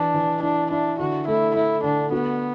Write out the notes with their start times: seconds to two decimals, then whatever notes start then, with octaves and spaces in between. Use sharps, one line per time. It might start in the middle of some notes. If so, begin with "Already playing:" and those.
Already playing: E3 D4
0.14 E3
0.43 D4 E4
0.71 D4 E4
0.99 D3 F#4
1.28 A3 E4
1.56 A3 E4
1.84 D3 D4
2.12 B3 F#4